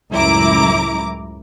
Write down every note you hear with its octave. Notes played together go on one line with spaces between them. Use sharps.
C#2 F#2 A2 E4 A#5 D6